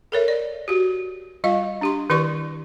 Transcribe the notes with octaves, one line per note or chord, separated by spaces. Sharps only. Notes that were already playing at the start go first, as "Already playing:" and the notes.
A4 A#4 C#5 E5
D5
F#4 G4
G3 F4 D#5 F5
D4 G4 C6
D#3 E4 G4 B4 D5 C#6